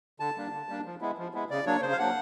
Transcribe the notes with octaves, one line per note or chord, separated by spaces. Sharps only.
D3 A5
G3 A#3 D4
D3
G3 A#3 D4
F3
G#3 B3 E4
F3
G#3 B3 E4
C#3 D5
F#3 A#3 D4 C#5
C#3 C5
F5
F#3 A#3 D4 F#5